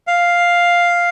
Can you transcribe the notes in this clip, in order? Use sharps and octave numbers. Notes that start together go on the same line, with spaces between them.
F5